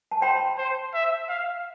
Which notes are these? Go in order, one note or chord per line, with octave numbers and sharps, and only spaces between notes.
A5
C5 G5 B5
C5
E5
F5